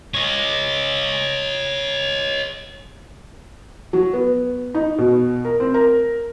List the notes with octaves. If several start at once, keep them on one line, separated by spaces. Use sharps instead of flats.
C#5 D#5
F#3
B3
D#4
B2
A#4
C4
A#4